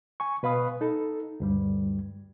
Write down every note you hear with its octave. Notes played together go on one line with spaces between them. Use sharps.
G#5 C#6
B2 B4 F5 B5 D#6
D#4 A4
D2 G2 G3